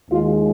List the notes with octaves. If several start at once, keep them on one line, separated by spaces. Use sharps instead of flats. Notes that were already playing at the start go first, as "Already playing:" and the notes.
D#2 D#3 G#3 F4